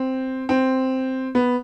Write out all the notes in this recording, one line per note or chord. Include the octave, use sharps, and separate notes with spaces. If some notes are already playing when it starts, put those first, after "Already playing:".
Already playing: C4
C4
B3